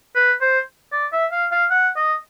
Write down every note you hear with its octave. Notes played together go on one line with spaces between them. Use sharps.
B4
C5
D5
E5
F5
F5
F#5
D#5